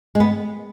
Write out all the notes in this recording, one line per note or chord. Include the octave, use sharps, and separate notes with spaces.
G#3
B3